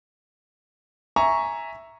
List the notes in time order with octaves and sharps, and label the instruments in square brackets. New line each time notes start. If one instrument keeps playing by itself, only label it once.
[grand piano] E5 G#5 A#5 C#6